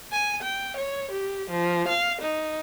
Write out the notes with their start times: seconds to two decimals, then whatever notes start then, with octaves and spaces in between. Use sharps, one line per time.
0.12 G#5
0.43 G5
0.77 C#5
1.12 G4
1.51 F3
1.88 F5
2.22 D#4